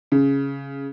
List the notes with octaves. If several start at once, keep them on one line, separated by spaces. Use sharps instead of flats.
C#3